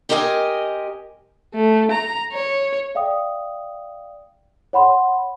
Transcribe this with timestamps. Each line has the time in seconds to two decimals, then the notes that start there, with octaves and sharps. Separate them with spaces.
0.09 C4 G4 A#4 D#5 F#5 G#5
1.55 A3
1.91 A#5
2.33 C#5
2.95 D5 E5 F5 G5 D#6
4.73 C#5 F#5 B5 C6